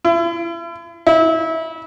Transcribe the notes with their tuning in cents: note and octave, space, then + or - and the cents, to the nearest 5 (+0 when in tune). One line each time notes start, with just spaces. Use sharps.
E4 +40
E4 -25